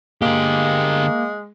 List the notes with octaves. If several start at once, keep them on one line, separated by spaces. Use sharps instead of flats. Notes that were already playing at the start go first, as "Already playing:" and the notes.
D3 G#3 A#3 G4